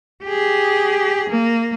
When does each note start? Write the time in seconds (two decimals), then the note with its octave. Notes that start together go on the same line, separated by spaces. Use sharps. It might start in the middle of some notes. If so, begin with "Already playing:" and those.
0.24 G4 G#4
1.29 A#3